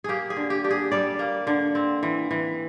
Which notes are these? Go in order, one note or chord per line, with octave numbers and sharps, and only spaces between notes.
A#3 G4 G#4
G#4
D3
G4
D4 G4
G#4
G3 D5
A#3
D3
C4
E3
E3